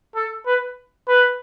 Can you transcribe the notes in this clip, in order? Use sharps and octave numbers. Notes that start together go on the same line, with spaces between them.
A4
B4
B4